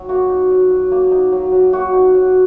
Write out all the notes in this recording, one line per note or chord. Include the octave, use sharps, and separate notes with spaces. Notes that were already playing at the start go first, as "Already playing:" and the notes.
Already playing: F#3 D#4
A#3 F#4
D#4
F#3
F#3
A#3
D#4
F#3
F#3
A#3 F#4
D#4
F#3